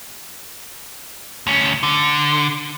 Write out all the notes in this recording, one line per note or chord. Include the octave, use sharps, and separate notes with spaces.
D2 C#4
D3